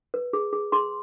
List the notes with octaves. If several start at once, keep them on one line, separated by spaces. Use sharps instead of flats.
B4
G#4
G#4
G#4 C6